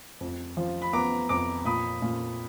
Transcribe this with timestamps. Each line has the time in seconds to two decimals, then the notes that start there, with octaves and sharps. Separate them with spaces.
0.21 F2
0.57 F3
0.82 B5
0.93 B3 A#5 D6
1.29 F2 A#5 D6
1.65 A#2 B5 D#6
2.02 A#2